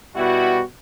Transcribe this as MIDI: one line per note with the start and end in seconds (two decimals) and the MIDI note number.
0.16 0.60 47
0.16 0.60 55
0.16 0.60 64
0.16 0.60 66